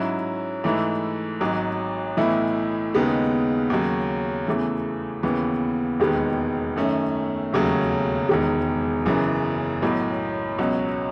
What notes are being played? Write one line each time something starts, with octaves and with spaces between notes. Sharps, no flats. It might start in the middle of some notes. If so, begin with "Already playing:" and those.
Already playing: G#2 F#3 C#4 E4
G#2 E3 A3 E4
G#1 G#2 F#3
B1 A2 E3 A3 E4
D#2 C#3 G#3 B3 D#4
D#2 C#3 F#3
E2 C#3 E3 A3
D#2 C#3 E3 B3
E1 D#2 D#3 G#3 B3
F#2 D#3 A3 C#4
E1 D#2 C#3 F#3 A3
E1 E2 D#3 G#3
F#1 F#2 C#3 E3
B1 A2 F#3
C#2 B2 F#3 C#4